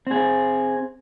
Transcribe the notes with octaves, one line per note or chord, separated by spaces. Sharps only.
C4 G#4